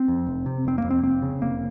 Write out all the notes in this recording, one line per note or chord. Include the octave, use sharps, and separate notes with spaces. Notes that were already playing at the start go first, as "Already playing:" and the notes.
Already playing: C4
F2
F1
C3
F1 C4
A#3
F2
C4
F1 C4
C#3
F1 A#3